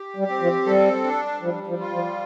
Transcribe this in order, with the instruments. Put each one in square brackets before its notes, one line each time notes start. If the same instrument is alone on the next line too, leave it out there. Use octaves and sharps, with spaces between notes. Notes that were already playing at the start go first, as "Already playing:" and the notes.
Already playing: [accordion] G4
[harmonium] G3
[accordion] C4
[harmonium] F3
[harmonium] G3 [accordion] A4
[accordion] D4
[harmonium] F3 [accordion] G3
[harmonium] F3
[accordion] F4
[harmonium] F3